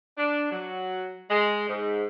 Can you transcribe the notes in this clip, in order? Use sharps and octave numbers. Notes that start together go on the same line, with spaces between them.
D4
F#3
G#3
G#2